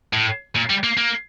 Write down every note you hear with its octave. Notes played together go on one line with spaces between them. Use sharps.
A2
A#2
G3
A#3
A#3